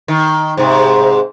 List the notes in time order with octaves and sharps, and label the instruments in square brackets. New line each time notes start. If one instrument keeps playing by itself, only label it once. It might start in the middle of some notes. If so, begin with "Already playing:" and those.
[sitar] D#3
G#2 C3